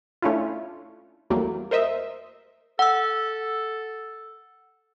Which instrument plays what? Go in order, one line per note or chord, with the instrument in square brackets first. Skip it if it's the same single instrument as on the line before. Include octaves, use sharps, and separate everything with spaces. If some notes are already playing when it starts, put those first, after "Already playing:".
[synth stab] A3 C#4 D4 E4 F4
E2 F#3 G3 A3 A#3
A#4 C5 D#5 E5
[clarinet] A4 [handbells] F#5 E6